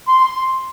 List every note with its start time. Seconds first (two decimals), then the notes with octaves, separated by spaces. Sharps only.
0.08 C6
0.25 C6